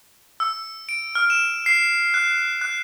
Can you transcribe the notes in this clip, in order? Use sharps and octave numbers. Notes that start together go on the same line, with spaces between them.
E6
D7
F6
E7
C7
F#6
F#6